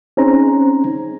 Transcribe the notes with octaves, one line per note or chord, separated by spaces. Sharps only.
C4 C#4 D#4 G#4 C5 A#5